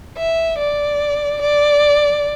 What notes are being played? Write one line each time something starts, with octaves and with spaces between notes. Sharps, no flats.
E5
D5
D5